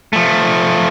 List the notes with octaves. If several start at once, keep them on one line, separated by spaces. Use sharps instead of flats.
F3 A3